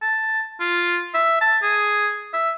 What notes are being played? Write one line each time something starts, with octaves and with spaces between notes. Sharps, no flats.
A5
F4
E5
A5
G#4
E5